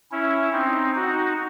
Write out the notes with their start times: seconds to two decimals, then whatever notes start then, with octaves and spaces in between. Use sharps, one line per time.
0.11 C#4 E4
0.53 C4 D#4
0.95 D#4 F#4